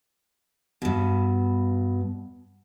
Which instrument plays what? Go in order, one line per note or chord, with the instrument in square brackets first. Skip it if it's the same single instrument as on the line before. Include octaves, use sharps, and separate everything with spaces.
[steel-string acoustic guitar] G2 B2